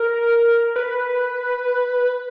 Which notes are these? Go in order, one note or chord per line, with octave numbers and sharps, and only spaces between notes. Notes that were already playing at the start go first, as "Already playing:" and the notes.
Already playing: A#4
B4